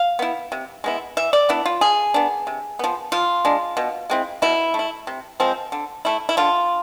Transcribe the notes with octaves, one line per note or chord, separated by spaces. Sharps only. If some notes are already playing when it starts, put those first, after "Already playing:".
Already playing: F5
B3 E4
C3
G#3 B3 E4
E3 E5
D5
B3 D4 E4
F4
F3 G#4
B3 D4
C3
F3 B3
F3 F4
G#3 D4
B2
G#3 C4 E4
B2 E4
A3
E4
C3
F3 G#3 C4
D3
A3 E4
E4
D3 F4